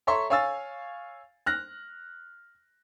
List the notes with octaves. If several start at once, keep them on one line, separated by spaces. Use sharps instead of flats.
A4 C#5 E5 A#5 C6 C#6
C#5 F5 G#5 E6 A6
F6 F#6 A#6